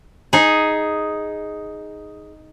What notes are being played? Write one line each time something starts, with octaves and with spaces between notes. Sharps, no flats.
D#4 G#4